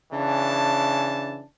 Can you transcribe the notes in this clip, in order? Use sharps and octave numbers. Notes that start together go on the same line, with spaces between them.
C#3 E3 D4 A5